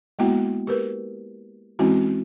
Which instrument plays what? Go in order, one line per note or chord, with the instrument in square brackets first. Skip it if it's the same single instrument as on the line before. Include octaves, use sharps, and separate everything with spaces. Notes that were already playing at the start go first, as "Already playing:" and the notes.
[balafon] G#3 A#3 B3 E4 F#4 G5
G4 A#4 B4
E3 G#3 C4 C#4 E4 F#4